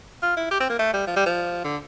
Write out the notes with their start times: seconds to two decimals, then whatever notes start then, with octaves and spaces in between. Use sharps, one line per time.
0.23 F4
0.37 E4
0.51 G4
0.60 C4
0.70 A#3
0.79 A3
0.93 G3
1.07 F3
1.16 G3
1.26 F3
1.64 D3